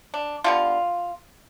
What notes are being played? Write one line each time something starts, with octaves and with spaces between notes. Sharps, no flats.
D4
D3 G3 B3 F4